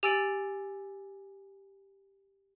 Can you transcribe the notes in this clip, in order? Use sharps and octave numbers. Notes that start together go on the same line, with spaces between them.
G4 G#5 E6 A6 D7 F#7